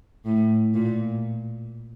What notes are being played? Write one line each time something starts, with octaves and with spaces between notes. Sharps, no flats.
A2
A#2